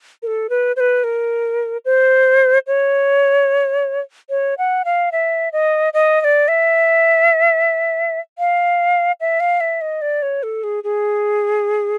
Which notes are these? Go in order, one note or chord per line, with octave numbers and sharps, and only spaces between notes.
A#4
A4
B4
C5
B4
A#4
C5
C#5
C#5
F#5
F5
E5
D#5
D#5
D#5
D5
E5
F5
E5
F5
E5
D#5
D5
C#5
A4
G#4
G#4